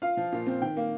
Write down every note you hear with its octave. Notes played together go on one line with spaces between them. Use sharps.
F4 F5
F3
A#2
C4
D#3 G5
A#3